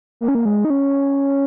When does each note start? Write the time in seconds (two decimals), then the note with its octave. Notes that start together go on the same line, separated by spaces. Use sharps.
0.21 A#3
0.28 C#4
0.35 A#3
0.45 G#3
0.65 D#4
0.70 C#4